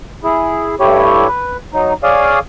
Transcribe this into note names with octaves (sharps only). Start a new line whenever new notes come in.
E4 G#4
G2 A3 E4 G4 C#5
B4
F#3 D#4
G#4 C#5 D5 F5 D#6